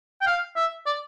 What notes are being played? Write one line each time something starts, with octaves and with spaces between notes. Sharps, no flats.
G5
F5
E5
D5